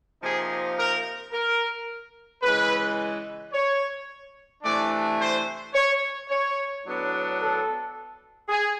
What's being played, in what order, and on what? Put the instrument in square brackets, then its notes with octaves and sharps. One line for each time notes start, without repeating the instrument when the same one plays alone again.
[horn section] C3 F3 A#3 D#4 G#4
A#4
A#4
C#3 E3 G#3 B4
C#5
C3 E3 A3 D4 D5
C5
C#5
C#5
A2 F#3 B3 D4
A4
G#4